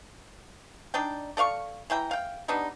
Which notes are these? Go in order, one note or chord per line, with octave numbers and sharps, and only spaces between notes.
D4 D#4 D5 G5
A4 D5 F5 C#6
E3 E4 G5 A#5
F5 G5
G3 B3 D4 D#4